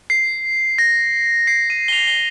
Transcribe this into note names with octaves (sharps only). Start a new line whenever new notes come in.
C7
A#6
C7
D#7
G7
F7
G7